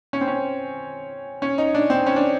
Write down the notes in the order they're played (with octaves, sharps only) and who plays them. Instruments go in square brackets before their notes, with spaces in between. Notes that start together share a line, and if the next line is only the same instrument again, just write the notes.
[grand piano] C#4
C4
C#4
C#4
D#4
D4
C4
C#4
D4